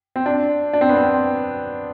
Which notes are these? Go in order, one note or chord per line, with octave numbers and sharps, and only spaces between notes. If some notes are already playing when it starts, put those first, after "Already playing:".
C4
D4
D4
C4
B3
C4